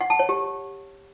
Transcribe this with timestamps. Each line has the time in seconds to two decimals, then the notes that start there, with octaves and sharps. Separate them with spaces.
0.01 F#5
0.10 A5
0.19 C#5
0.29 G4